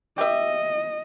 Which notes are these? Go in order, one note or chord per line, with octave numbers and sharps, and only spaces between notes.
G4 D#5 E5